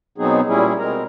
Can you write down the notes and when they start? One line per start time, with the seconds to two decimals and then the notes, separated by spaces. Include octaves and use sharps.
0.18 B2 F#3 B3 C4 D#4 G#4
0.47 A#2 G3 C#4 E4 G#4
0.79 B2 G#3 C4 A#4 A#5